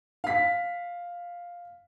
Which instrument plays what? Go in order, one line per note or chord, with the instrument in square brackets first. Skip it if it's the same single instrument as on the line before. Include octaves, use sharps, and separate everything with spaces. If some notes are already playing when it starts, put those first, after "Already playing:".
[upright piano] F5 B6